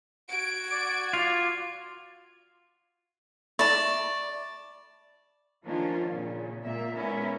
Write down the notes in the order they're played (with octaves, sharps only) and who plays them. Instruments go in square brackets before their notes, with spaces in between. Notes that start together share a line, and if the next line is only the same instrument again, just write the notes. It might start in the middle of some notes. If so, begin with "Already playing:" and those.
[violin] F#4 G#6 [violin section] D7
[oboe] D5
[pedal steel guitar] F4
[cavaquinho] D5 A5 [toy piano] E5 B5 C#6
[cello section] D#3 F3 A#3 C#4 D4 F4
A#2 C#3
A#2 G#3 A#3 E5
G#3 B3 C#4 E4 A#4